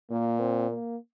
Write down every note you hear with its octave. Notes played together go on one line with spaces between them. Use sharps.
A#2 A#3
C4
A#3